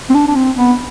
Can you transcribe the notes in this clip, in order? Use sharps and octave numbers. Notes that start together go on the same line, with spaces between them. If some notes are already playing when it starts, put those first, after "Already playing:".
C4
D4
D4
C4
B3